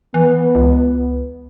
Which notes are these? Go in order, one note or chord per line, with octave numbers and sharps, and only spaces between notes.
E3 B3
C#2